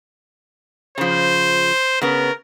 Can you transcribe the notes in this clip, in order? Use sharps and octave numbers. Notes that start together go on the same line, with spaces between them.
C#3 F3 C5
C#3 B3 A#4